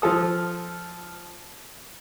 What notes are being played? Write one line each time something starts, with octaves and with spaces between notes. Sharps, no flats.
F3 F4 A4 D#6